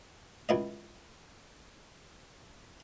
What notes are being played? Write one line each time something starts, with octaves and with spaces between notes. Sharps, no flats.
C#2 E4 D#5